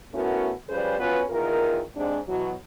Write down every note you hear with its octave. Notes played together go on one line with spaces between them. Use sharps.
A3 B3 C#4 E4 F#4 A#4
F3 G3 C#4 G#4 B4 C5
B3 C#4 F4 F#4 B4
E2 D#3 F4 A#4
G#2 C3 D4
B2 E3 F#3